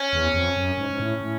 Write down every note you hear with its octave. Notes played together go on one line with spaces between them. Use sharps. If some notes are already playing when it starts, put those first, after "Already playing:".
Already playing: C#4
E2
F2
F#2
G#2
G#2
A2
A2